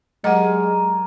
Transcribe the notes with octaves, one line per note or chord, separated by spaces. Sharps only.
F#3 G#3 A#4 D5 D#5 F#5 G#5